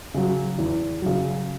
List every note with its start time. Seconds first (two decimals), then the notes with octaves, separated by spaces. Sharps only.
0.14 C#3 F#3
0.59 E2
1.02 C#3 F#3